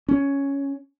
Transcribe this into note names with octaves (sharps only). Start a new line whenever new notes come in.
C#4